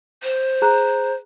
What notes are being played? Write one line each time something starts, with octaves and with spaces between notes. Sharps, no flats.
C5
G#4 A#5 F#6